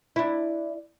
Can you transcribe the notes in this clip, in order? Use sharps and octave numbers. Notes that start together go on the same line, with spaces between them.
D4 E4